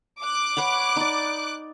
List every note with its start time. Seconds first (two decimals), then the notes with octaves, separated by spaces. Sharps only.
0.21 D6 F#6
0.57 B4 C#5 F#5
0.96 D#4 D5